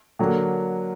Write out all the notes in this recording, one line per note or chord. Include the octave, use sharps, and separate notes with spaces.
D3 F#3 A#3